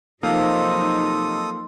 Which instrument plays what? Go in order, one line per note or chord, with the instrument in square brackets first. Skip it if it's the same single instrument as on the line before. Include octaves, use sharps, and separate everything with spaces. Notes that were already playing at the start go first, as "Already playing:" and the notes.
[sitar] C3 [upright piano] F3 A#3 F5 [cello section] F#3 D#4 [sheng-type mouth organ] A4 D#6